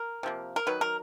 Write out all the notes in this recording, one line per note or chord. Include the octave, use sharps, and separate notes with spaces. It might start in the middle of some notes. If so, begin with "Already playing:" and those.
Already playing: A#4
C3 F3 A#3
A#4
D#3 F#3 B4
A#4